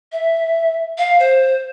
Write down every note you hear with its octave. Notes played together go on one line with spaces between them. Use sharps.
E5
F5
C5